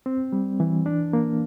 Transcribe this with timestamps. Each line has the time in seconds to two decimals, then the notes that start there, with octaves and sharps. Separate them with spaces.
0.06 C4
0.32 G3
0.60 E3
0.86 D4
1.13 A#3